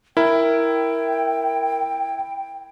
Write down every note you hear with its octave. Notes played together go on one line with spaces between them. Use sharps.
E4 A#4 G5